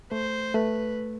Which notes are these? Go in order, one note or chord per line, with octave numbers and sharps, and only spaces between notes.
A3 C5
A3 B4